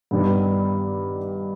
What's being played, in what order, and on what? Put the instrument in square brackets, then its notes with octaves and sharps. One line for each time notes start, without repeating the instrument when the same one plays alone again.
[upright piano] G2 D#3 B3 D4